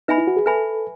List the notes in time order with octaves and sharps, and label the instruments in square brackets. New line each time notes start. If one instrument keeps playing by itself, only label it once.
[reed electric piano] D#4 [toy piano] B4 E5 G#5 B5
[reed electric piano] E4
F#4
G#4
[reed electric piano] A4 [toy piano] B4 E5 G#5 B5